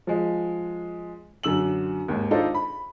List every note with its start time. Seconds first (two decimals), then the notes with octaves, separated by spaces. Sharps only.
0.07 F3 G#3
1.43 F#2 D3 E6 F#7
2.08 D#2 G#2
2.31 D4 D#4 F4 A4 C5
2.55 B5